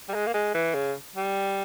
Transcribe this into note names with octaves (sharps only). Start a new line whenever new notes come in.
G3
G#3
A#3
G#3
E3
C#3
G3